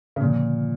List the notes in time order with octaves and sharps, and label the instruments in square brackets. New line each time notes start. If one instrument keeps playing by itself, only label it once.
[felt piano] C#3
[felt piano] A#2 [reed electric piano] D3 F3